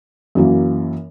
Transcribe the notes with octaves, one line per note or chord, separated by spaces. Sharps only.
F#2 E3 F#3 A#3